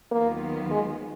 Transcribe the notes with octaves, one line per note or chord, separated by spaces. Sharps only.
D#2 D#3 F#3 A#3 B3 F4
G#3